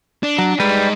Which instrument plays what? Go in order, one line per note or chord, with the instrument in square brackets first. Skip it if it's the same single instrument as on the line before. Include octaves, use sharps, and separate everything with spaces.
[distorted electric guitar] D4
[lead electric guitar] F#3
[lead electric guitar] G3 B4 [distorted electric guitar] G#3 D#4